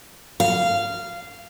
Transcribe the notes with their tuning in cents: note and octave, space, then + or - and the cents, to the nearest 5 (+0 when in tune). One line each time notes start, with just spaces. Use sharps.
F5 -15